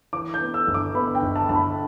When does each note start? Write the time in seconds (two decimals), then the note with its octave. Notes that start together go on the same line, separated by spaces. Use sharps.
0.13 E3 D6
0.34 G6
0.41 B3
0.54 E6
0.67 G1
0.74 D6
0.95 B3 B5
1.15 G5
1.22 G1
1.36 A5
1.49 G1 A5
1.56 B5